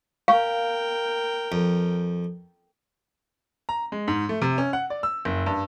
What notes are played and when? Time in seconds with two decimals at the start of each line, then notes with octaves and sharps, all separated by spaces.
0.28 A#4 F5 G5
1.52 F2
3.69 A#5
3.92 G#3
4.08 G#2
4.29 A3
4.42 C3
4.58 C#4
4.73 F#5
4.90 D5
5.03 E6
5.25 F#1
5.46 G2